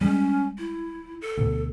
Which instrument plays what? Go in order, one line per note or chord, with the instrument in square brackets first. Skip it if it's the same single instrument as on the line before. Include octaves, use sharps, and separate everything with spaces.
[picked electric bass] G3 G#3 [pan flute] C#4
[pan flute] E4
A4
[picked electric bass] D2 B2